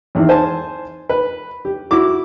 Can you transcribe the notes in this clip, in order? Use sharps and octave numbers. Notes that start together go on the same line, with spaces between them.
G#1 E2
C5 G#5 A5
B4
G4
E4 F#4 D6